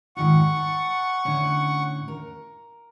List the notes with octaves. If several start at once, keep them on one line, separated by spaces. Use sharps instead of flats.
G#2 D#3 F4 F#5 C#6
A4
A2 D3 C#4
A#4